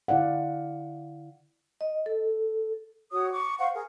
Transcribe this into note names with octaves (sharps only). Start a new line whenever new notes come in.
D3 E4 D5 F5 F#5
D#5
A4
F#4 C#5 D#6
C#6 D6
C5 F5 F#5 C#6
G#4 A#4